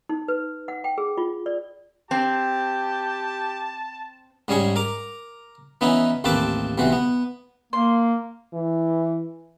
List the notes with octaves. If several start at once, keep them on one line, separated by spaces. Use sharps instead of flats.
D#4
B4
F#5
G5
G#4
F4
D5
C4 G4 A5
G#2 G3 C#4 G#4 C#6
A#4 A#5 D6
E3 B3 C#4 D#4 E4
A1 D#2 C4 B4 A5 D6
B1 C3 E3 F#4
B3
A#3 C6
E3